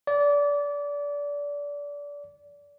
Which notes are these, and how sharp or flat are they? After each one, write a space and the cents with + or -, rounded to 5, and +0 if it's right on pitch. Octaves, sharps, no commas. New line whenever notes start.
D5 -25